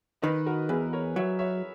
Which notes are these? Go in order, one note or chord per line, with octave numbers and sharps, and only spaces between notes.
D#3 B4 D#5
F#4 A#4
E2 G#4 B4
A#4 C#5
F#3 C#5 E5
C#5 E5